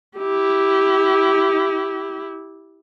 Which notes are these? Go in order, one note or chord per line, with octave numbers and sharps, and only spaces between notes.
E4 G4